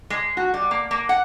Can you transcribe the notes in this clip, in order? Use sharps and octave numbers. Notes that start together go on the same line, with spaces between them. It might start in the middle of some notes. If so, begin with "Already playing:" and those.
G#3
F#4
G3
A#3
A#3
F#5